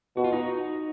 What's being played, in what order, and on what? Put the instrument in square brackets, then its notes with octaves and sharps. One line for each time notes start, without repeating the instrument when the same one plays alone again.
[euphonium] B2 [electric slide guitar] F#4
[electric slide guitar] F4
D#4 F#4